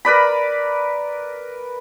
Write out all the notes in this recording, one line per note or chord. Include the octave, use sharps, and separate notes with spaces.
A#4 B4 D5 B5